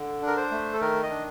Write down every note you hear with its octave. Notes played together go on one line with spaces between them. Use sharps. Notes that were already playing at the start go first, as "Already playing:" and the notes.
Already playing: D3
D4
A#4
C5
A3
A4
D#3 A#4
D#5
D4